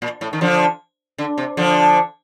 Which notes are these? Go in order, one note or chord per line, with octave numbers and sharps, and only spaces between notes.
A#2
A2
D#3
D3 F3
D3
C3
D3 F3